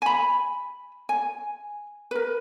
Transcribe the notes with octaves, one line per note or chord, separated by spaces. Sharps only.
G#5 B5
G#5
A#4 B4